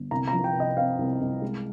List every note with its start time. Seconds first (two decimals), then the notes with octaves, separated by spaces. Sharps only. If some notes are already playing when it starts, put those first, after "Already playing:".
Already playing: G1
0.11 C2 A#5
0.28 A#5
0.33 F3
0.44 G5
0.55 C3
0.60 D#5
0.77 C4 F5
0.99 C2
1.21 C2
1.42 G#3